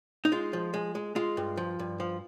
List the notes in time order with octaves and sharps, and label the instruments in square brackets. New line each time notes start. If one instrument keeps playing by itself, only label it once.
[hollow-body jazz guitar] D#4
G#3 F4
F3
G#3
G#3
G#3 F4
G2
F3
G2
F3